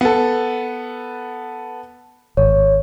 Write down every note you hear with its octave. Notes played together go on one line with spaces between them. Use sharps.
B3 A4
G#1 C#5